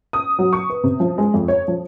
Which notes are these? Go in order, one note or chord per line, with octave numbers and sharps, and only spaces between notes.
D#6
F#3
C#6
B4
C3
F3
G#3
F2
C#5
F3